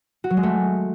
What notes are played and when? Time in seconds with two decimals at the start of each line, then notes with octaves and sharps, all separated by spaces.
0.24 F#4
0.30 F#3
0.37 G#3
0.43 A3